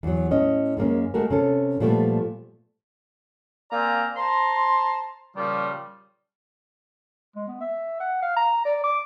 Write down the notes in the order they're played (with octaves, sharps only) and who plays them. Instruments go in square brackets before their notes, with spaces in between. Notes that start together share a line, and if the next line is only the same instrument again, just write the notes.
[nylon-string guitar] E2 F#3
A2 C#4 D#5
F#2 G#3 A#3 C#4
G#3 A3 F#4 A#4
C3 C#4 A4
A#2 F3 G3 A3 B3
[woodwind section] A#3 C4 D5 F5 G#5 A#5
C5 A5 A#5 C6
A#2 C#3 F3 G3
[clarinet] G#3
B3
E5
F#5
F5
A#5
D5
D6